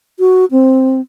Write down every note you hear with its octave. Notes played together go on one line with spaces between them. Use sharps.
F#4
C4